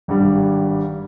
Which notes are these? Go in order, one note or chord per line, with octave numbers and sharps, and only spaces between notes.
G#1 G2 G3